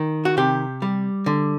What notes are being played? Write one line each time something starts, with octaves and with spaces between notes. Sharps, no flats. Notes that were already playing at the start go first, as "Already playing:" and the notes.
Already playing: D#3
F#4
C3 G4
G3
D3